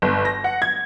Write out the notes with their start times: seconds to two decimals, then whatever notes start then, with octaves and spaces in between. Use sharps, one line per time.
0.02 G1
0.25 A#6
0.44 F#5
0.62 G#6